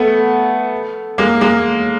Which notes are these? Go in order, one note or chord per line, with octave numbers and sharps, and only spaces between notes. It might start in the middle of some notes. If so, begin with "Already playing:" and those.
Already playing: A3 B3
G#3 A#3
G#3 A#3